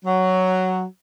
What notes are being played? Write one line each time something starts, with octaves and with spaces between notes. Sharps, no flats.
F#3